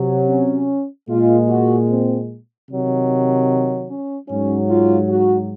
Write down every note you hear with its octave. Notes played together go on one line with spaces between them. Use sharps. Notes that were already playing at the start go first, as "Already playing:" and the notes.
Already playing: C3 F#3
C#4
A#2 G#3 F4
F#4
C4
C3 D#3 F#3
C#4
G#2 F#3 C#4
F4
F#4